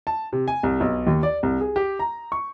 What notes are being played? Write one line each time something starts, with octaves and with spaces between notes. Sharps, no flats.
A5
C3
G#5
C2
B1
D#2
D5
C2
G#4
G4
A#5
C#6